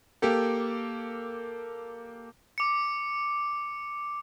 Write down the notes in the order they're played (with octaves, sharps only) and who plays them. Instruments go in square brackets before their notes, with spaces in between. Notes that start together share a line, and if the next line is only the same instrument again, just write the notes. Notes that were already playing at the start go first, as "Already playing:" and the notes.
[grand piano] A#3 G4 A4
[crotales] D6 C#7